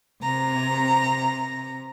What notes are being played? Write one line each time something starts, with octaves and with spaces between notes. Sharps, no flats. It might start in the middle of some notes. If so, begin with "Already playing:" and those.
C3 A#5